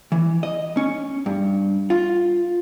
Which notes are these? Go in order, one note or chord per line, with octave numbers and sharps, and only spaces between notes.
E3
D#5
C#4
G2
F4